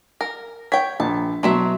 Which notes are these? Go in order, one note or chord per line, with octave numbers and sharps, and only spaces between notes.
A#4
C#5 G5 B6
A#1 A5
B2 F#3 A3 E4 E5 C6